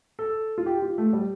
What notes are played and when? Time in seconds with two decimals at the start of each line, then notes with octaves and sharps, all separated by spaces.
0.19 A4
0.58 F4
0.66 G4
0.82 F4
0.98 A3
1.13 G3